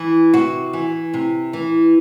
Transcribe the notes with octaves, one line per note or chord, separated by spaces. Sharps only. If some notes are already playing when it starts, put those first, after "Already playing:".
Already playing: E3
C3 F#4
E3
C3
E3